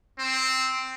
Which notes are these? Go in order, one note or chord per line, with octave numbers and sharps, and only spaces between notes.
C4